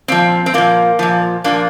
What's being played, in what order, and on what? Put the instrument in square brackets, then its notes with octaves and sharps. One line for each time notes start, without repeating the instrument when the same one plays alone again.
[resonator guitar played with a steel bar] A#2 F3 C4
C4
A#2 F3 A#3
A#2 F3
A#2 F3 A#3 D4